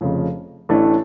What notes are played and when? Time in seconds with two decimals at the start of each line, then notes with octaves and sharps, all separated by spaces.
0.01 F1 F2 C#3 F3
0.69 A1 A2 E3 A3 D4